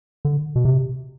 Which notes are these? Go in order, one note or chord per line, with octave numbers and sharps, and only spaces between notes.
D3
B2
C3